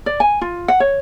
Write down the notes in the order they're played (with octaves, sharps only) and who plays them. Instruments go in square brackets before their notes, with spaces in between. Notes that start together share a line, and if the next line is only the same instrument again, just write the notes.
[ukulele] D5
G#5
F4
F#5
C#5